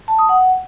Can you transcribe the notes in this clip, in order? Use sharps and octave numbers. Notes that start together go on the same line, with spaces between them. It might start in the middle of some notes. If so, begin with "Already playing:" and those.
A5
D#6
F#5